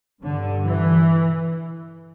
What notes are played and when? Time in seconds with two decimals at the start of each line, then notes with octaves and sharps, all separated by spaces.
0.23 G2 D3
0.67 E3